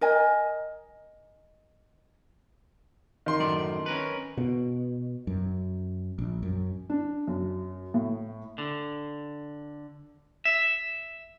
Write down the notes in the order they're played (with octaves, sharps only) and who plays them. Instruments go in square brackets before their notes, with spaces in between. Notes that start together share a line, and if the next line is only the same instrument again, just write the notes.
[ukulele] A#4 D#5 G#5
[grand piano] D#3 C6
[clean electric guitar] F#2 A2 D5
C#4 A#4 B4
[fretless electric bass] B2
F#2
A#1
F#2
[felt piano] D4
F#2
A2
[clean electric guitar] D3
E5